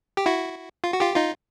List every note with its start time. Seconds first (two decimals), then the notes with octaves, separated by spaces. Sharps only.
0.17 G4
0.26 E4 F#4
0.84 F4
0.93 F#4
1.00 F4 G4
1.16 D#4 F4